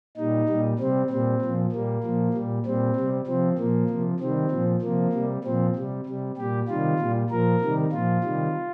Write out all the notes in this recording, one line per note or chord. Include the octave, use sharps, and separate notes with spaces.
A#2 G3 D#4
A#2 G3
C3 G3 C4
A#2 G3 C4
A#2 F3
A#2 G3 A#3
A#2 F3
A#2 G3
A#2 G3 C4
C3 G3
C3 F3 C4
A#2 F3 A#3
C3 F3
C3 D#3 G3 C4
A#2 F3
C3 F3 A#3
C3 G3
A#2 F3 C4
C3 G3
C3 G3
A#2 G3 G4
C3 D#3 G3 F4
A#2 G3
A#2 F3 A#4
C3 D#3 G3
A#2 F3 F4
C3 D#3 G3